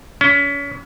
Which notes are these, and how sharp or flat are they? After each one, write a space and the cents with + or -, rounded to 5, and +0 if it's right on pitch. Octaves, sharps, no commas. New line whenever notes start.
C#4 +35